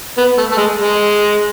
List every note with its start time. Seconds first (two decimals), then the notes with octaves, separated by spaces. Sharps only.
0.17 B3
0.38 A3
0.52 A3
0.57 G#3
0.78 G#3